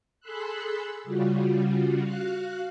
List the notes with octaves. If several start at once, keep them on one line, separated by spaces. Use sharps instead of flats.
G#4 A4 B5 C6 E6 F#6
C#3 G3 F4 F#4
F#4 F5 F#6